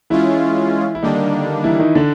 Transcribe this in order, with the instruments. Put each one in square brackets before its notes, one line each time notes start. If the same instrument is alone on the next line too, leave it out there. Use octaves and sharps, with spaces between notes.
[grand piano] E3 E4 [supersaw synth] G#3 C#4 F4
[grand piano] E4
[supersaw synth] D3 G3 A#3 D4 [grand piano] D#3 D#4
[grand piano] E3 E4
D#3 D#4
D3 D4